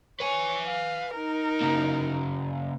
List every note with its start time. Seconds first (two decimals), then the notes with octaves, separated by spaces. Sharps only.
0.20 B4 C#5 G#5
0.67 F5
1.15 D#4 A#4
1.61 C#3 A#3